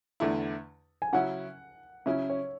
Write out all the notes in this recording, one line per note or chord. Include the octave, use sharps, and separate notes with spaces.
E2 D3 A3 E4
G#5
C#3 F#3 C#4 E4 F#5
C#3 F#3 C#4 E4 E5
C#5